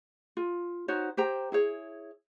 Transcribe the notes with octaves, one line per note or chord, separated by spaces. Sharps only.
F4
D#4 F#4 C5 C#5
G4 C5 G5 A#5
E4 G#4 C#5